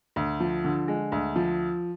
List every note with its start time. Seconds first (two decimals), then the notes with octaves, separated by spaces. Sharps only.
0.16 D2
0.40 F3
0.64 D3
0.88 G#3
1.12 D2
1.36 F3